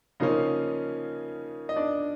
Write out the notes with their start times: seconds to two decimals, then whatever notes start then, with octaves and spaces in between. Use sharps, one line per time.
0.20 C#3 F3 A#3 C#4 D#4 D#5
1.69 D#5
1.76 D4 D5